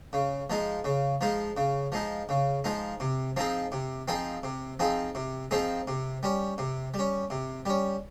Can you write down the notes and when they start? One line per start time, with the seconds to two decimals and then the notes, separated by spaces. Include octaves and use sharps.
0.13 C#3
0.50 F3 G#3 D#4
0.84 C#3
1.21 F3 G#3 D#4
1.57 C#3
1.92 F3 G#3 D#4
2.29 C#3
2.64 F3 G#3 D#4
3.00 C3
3.36 F3 C4 D#4 G#4
3.72 C3
4.08 F3 C4 D#4 G#4
4.43 C3
4.80 F3 C4 D#4 G#4
5.15 C3
5.51 F3 C4 D#4 G#4
5.88 C3
6.23 G3 C#4
6.58 C3
6.94 G3
6.99 C#4
7.30 C3
7.66 G3 C#4